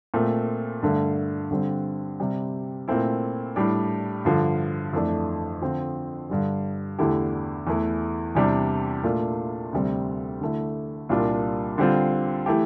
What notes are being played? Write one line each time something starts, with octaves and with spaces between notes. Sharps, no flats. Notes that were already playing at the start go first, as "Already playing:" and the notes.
A#2 A3 C4
G2 D3 A3
G2 D3 G3 C4
C3 G3 C4
A#2 A3 C4 E4
A2 G3 D4
G2 D3 F3
F2 E3 A3 D4
D3 F3 C4 F4
G2 D3 G3
E2 D3 A3 E4 G4
E2 E3 A3
E2 C3 G3 D4
A#2 A3 D4 F4
D2 C3 G3 C4
D3 A3 E4
C2 A#2 G3 D4 F4
D3 G3 C4 F4
E3 A3 E4 G4